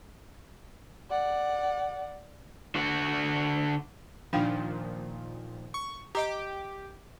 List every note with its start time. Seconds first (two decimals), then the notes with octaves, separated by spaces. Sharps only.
1.10 D5 F#5
2.75 D3 F#4
4.33 A#2 D#3 F3 D4 F5 G5
5.74 C#6
6.15 G4 D#5 A#5 D6